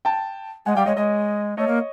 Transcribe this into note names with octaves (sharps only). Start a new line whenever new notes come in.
G5 A5
G#3 F#5 G#5
G3 F5 G5
G#3 C#5 D#5
G#3 C#5 D#5
A3 C#5 D#5
A#3